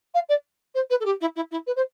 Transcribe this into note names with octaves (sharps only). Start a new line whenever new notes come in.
F5
D5
C5
B4
A4
G4
E4
E4
E4
B4
C5